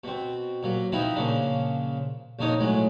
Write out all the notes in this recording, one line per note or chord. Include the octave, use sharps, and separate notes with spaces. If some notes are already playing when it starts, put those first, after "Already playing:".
B2 C4
A#2 F#3
F3 B3 C4 D#4 E4
A#2 C#3 F3 D4
A#1 F2 D4 D#4 C#5 D#6
A2 F#3 G#3